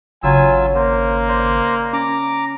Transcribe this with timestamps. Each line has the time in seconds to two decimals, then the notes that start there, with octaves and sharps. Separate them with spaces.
0.23 G#1 C#3 F#3 F4 G#5 E6
0.76 A#3 C5
1.28 C5 D5
1.93 C#4 A#5 D6